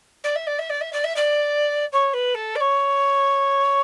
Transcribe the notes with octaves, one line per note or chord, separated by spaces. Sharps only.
D5
E5
D5
E5
D5
E5
D5
E5
D5
C#5
B4
A4
D5
C#5